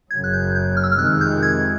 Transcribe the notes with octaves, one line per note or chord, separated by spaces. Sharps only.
F#1 F#2 C#3 F#3 G#6
F#6
G6
G6
F6
E6
F6
F2 C3 D#3 G#3 F#6
G6
G#6